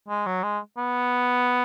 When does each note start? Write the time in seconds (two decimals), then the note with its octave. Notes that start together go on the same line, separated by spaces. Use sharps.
0.08 G#3
0.26 F#3
0.43 G#3
0.77 B3